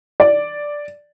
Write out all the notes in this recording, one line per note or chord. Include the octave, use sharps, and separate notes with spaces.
D5